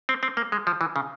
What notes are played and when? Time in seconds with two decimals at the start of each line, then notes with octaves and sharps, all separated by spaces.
0.09 C4
0.23 C4
0.37 A#3
0.52 G#3
0.67 F3
0.81 E3
0.96 C#3